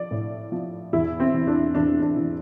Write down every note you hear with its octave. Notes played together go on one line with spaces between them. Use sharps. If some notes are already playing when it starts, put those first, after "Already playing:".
Already playing: F3 D5
A2
F3
E2 E4
C4
E3
D4
E2 D4
D4
E3